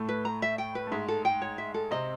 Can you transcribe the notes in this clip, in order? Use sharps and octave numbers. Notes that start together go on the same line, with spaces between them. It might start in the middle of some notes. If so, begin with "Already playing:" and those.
Already playing: A2 A3
B4
A#5
E5
G5
B4
A3
G#2 G#3 E5
A4
G5
C#5
E5
A4
C3 C4 D#5